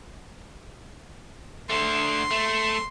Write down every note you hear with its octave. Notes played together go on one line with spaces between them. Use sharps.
D3 A3 C6
A3